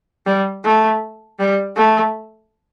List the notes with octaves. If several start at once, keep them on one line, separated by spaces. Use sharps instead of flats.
G3
A3
G3
A3